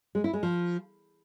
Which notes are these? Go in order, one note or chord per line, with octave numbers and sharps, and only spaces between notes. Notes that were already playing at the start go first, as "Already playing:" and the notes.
G#3
E4
G#3
F3